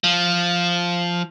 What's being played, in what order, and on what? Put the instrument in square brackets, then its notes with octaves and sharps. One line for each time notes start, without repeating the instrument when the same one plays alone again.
[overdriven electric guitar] F3